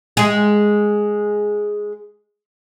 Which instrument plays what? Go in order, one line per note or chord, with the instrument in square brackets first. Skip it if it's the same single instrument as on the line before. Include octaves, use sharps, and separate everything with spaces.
[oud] G#3 G#4